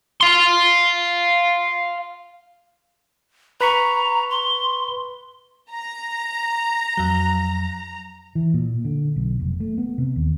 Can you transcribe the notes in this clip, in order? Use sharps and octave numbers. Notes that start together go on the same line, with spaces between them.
F5 C6
B4 A#5 B5 C#6
C6
A#5
F2 F#3
E3
A#2
D3
B1
F1
A3
B3
C3
D#2